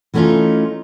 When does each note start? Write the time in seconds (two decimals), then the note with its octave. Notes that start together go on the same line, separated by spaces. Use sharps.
0.14 E3 A3 B3 C#4 D#4 F4